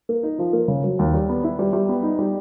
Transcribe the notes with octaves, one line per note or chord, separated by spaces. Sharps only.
A#3
D#4
F3
A#3
C#3
F#3
D#2
G3
B3
E4
G3
G3
B3
D#4
G3